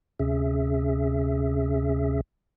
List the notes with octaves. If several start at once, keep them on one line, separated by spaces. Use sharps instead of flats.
D2 C3 C#4 G#4 E5